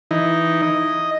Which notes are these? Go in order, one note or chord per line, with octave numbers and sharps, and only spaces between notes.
E3 D#4
D#5